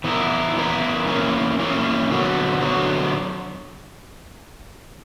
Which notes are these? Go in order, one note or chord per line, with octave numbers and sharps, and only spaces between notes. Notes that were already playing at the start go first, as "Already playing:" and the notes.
E3 B3 E4 A#4
E3 B3 E4 A#4
E3 A#3 C#4
E3 A#3 C#4
D3 F#3 B3
D3 F#3 B3